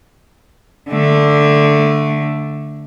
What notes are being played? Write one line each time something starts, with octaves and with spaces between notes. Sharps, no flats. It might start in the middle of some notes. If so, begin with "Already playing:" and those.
D3 A3